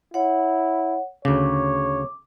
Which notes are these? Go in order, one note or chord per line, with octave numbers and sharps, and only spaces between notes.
E4 C#5 F#5
D2 C#3 C#5 D6